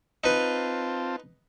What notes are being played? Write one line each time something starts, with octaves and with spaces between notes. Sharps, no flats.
C4 D#4 F4 B4 A5